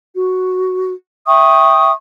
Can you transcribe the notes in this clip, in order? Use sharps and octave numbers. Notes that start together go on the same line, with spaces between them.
F#4
E5 G5 C#6 D#6